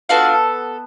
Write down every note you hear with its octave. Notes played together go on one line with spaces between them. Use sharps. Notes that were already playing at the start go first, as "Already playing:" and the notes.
B3 D4 F4 F#4 A4 F5